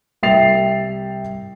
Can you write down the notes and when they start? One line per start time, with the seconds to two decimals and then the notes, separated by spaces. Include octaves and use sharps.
0.23 C2 E5 G5 A6 C7 F7